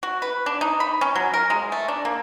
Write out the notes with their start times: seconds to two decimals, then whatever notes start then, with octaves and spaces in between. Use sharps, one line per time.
0.03 F#4
0.22 B4
0.46 D4
0.61 D#4
0.80 B5
1.01 C#4
1.15 F#3
1.34 A#4
1.50 G#3
1.72 A3
1.88 D4
2.05 A#3